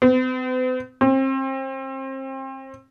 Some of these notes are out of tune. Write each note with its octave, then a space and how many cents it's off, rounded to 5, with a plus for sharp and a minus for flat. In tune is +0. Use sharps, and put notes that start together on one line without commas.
C4 -45
C4 +35